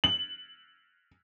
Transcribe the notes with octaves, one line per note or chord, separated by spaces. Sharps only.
F#7